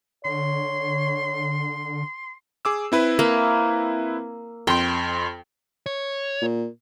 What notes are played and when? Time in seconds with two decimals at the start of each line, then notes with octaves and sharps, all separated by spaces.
0.25 D3 C#5 C6
2.65 G#4 D6 E6
2.92 C4 E4 B4
3.19 A#3
4.67 F2 G5 C6
5.86 C#5
6.42 A#2